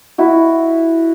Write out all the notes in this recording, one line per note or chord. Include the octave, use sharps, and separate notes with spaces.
E4 F#4